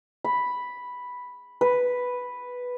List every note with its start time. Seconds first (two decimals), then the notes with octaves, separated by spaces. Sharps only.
0.24 B5
1.61 B4